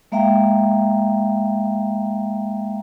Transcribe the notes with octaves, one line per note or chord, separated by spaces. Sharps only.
G#3 A#3 E5 F5 G5 A#5